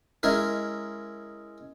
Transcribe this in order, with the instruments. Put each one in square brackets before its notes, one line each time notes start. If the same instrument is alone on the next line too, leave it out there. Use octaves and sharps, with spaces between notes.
[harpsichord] G#3 C#4 E4 A#4